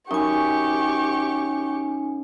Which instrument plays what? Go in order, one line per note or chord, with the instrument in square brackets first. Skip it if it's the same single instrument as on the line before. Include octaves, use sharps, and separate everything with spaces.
[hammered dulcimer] F#2 [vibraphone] D#4 G#5 [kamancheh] G4 C#6